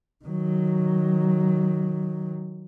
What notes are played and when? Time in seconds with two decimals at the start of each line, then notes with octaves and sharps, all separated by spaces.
0.25 D#3 F#3